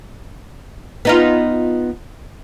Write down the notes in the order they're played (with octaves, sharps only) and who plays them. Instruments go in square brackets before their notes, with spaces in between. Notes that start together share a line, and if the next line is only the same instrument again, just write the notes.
[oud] B3 D#4 F4